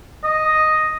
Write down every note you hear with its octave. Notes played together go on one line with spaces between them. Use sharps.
D#5